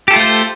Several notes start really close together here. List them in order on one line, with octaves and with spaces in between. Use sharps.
G4 A4 F4 A3 C5